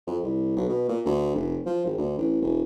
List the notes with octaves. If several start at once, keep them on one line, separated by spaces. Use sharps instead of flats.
F2
C2
B1
B2
A#2
D2
F1
F3
G#1
D2
A1
E1